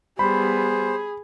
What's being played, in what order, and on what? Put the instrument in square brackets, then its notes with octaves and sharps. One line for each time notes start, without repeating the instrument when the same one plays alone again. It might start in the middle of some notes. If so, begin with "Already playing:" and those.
[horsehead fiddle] G3 B3 [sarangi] G#4 [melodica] C5 [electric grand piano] B5